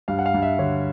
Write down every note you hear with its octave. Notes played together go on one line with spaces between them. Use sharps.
G2 F5
F#5
F5
G2
E5
D3 C#5